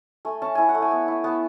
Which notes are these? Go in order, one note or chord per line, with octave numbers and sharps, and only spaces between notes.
A3 G#5
C#4 A5
E4 G#5
F#5
A3
G#5
B3
E4
B3 A5